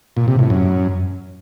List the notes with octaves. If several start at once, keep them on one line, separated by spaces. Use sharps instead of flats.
A#2
C3
A2
F#2